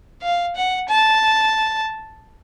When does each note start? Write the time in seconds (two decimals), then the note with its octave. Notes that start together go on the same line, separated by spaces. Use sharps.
0.22 F5
0.56 F#5
0.88 A5